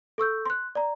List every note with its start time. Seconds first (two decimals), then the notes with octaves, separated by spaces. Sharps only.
0.18 A4 C#6 E6 G6
0.46 C6 F#6
0.75 D5 A#5